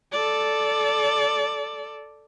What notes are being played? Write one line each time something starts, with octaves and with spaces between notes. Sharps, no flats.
A4 D5